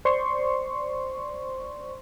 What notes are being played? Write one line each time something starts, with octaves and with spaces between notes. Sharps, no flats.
C5 D5 C6 C#6